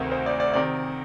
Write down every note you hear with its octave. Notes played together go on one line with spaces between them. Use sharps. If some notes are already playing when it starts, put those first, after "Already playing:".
Already playing: D2 C3 D#3 A#4
C5
D5
D5
C3 D#3 D5